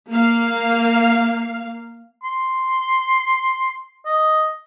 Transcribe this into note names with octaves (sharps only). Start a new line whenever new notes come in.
A#3 F5
C6
D#5